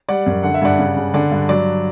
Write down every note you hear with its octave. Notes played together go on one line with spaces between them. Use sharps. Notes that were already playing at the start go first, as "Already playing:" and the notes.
G3 D5 F#5
F#2
D3 F#5
E5
G2 D5 F#5
C#3
C#3
D3 D5 F#5
G2
F#3 D5